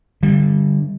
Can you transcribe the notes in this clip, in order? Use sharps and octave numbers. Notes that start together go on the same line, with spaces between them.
D3 G3